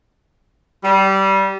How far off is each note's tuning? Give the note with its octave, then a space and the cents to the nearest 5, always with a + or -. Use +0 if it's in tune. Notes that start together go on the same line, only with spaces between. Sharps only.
G3 -20